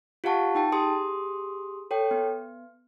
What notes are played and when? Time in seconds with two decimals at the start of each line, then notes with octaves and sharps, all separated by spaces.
0.24 F4 G4 F5 F#5 A5 C#6
0.55 D#4 G5 A5
0.72 G4 G#4 C6 D#6
1.91 A4 C#5 G5
2.11 B3